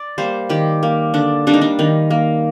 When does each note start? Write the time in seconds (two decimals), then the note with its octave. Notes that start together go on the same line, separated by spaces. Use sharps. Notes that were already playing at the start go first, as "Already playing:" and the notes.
Already playing: D5
0.18 G3 A#3 C5
0.49 D#3 G4
0.83 A#3
1.14 D3 D4
1.47 G3 A#3 D4
1.54 D#4
1.61 D4
1.79 D#3 D#4
2.11 A#3